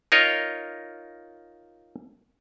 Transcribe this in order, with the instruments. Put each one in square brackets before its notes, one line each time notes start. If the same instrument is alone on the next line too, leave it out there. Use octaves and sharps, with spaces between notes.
[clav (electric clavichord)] D#4 F4 A#4 C#5 D#5